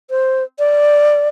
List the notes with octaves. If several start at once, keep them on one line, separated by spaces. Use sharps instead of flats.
C5
D5